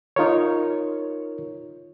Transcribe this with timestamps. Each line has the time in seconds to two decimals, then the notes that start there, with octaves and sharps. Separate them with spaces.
0.16 D#4 F4 A#4 C#5